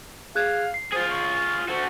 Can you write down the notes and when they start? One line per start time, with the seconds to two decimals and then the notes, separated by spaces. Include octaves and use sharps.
0.35 G#4 F5 F#6 G#6
0.74 C7
0.93 F4 G#4 C5
1.10 C#6
1.68 A3 F#4 C5